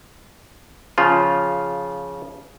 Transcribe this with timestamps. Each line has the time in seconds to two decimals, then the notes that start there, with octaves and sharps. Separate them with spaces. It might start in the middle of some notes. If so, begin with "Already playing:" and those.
0.98 C#3 F3 F4